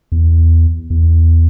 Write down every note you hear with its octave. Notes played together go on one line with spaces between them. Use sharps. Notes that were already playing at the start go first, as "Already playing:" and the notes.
E2
E2